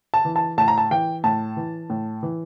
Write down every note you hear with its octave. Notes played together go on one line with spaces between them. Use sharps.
A5
E3
A5
A2 A5
A#5
A5
E3 G5
A2 A5
E3
A2
E3